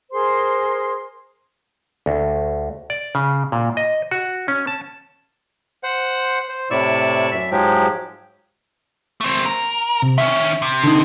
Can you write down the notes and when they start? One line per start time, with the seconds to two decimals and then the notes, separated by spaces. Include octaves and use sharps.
0.12 G#4 A#4 C5 C6
2.06 D2
2.90 D5
3.15 C#3
3.52 A#2
3.77 D#5
4.11 F#4
4.48 C#4
4.67 A5
5.83 C5 F#5
6.49 C5
6.71 A2 C3 E4 D5 C#6 E6
7.31 F#2 E5
7.51 G#2 F3 F#3 G#3 G4
9.21 A3 C4
9.46 A#4
10.02 C3
10.18 D#3 C#4 E5
10.62 C3
10.84 D3 D#4